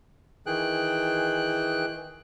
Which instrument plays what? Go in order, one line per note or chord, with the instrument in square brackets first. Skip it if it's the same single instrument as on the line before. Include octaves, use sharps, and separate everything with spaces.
[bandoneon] D#3 E3 G#4 G5 F#6